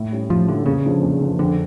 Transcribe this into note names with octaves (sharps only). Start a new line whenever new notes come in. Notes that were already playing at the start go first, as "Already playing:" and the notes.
Already playing: A2
G3 C#4 E4
A2 F3
D3 G3 C#4 E4
E2 C#3
D3 F3
E2
D3 F3
F2 D3